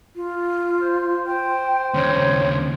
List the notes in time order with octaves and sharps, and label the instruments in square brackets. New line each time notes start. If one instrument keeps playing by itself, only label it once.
[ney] F4
[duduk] C5
[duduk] C5 [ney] G5
[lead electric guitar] D#2 C#3 [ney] C#5